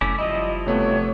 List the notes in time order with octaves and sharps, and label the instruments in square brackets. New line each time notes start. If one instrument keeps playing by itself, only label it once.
[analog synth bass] F#1 [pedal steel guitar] A3 C#4 E4 [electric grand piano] D6
[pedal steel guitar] F3 G3 E4 [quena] D#5
[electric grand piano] C3 A3 B3 [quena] C#5